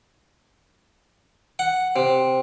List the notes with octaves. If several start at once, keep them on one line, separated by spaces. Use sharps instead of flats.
F#5
C3